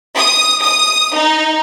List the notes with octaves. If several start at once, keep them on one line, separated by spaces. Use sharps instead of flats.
D#6
D#6
D#4